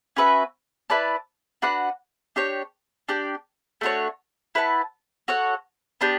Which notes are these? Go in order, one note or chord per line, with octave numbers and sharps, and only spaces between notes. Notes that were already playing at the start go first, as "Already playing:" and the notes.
C#4 F#4 B4 E5
E4 B4 D5 A5
D4 F#4 B4 F#5
D4 G4 C#5
D4 G4 D5
A3 D4 F#4 C#5
E4 B4 F#5 A5
F#4 A4 C#5 F#5
B3 D4 G4